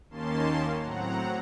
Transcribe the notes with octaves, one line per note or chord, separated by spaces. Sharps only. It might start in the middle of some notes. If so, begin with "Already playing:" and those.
D#2 D#3 A#3 C#4 A5 C6
A2 F#3 C4 F#5 A#5